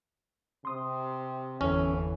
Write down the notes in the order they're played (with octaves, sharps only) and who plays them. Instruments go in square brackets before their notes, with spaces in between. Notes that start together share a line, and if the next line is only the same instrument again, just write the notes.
[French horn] C3 [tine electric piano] C6 D#6
[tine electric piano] G1 E2 A4 [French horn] E3 [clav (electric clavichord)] C#4